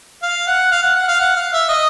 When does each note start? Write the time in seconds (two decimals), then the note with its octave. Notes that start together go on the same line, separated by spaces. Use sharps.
0.23 F5
0.47 F#5
0.71 F5
0.83 F#5
0.96 F#5
1.08 F5
1.20 F#5
1.36 F5
1.53 E5
1.69 D#5